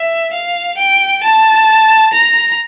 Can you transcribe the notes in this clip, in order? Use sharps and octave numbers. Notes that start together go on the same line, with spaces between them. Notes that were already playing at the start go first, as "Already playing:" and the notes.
Already playing: E5
F5
G5
A5
A#5